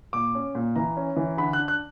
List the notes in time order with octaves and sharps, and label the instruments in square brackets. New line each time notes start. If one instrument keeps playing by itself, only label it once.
[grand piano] A#2 D6
C#4
A#2
E3 A#5
C#4
E3
D3 B5
F#6
D4
F#6